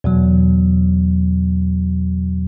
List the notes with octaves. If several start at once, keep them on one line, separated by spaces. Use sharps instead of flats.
E2 B2 F#3